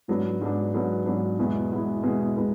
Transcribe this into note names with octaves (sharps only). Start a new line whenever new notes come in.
G#2 F#3 B3 D4
G#2 F#3 B3 D4
G#2 F#3 B3 D4
G#2 F#3 B3 D4
E2 B2 G#3 B3 E4
E2 B2 G#3 B3 E4
E2 B2 G#3 B3 E4
B2 G#3 B3 E4